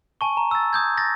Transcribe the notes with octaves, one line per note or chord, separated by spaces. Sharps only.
G#5 A5 C#6
A#5
E6 A6
D#6 G6 G#6
A6 A#6